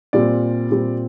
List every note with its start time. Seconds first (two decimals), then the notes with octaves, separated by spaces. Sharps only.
0.13 A#2 G3 C4 D5
0.70 A#2 G3 C4